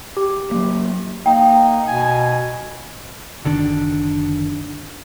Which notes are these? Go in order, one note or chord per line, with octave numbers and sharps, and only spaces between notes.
G4
F#3 A#3
A#3 D#4 G5
B2 G#5
F#1 D3 D#3 D4